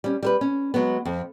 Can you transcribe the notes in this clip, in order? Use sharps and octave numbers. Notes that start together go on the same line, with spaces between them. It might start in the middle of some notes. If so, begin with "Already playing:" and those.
G3 C#4
G3 A#4 B4
C#4
F#3 G#3 B3
F2